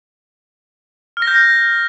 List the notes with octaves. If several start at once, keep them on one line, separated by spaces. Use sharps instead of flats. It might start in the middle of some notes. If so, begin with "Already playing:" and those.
F6
A#6
G6